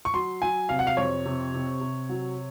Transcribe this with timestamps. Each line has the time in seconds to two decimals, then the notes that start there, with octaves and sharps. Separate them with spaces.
0.05 C#6
0.14 F#3 C6
0.42 F#3 G#5
0.69 C3 F5
0.79 F#5
0.87 F5
0.97 F2 C#5
1.26 C3
1.54 C3
1.81 C3
2.09 F#3